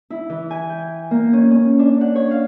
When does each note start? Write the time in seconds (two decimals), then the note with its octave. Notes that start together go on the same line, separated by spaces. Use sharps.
0.10 E4
0.30 E3
0.51 G#5
0.69 G5
1.11 A#3
1.33 C#4
1.51 C#4
1.79 D4
2.01 F#5
2.16 C#5
2.31 F5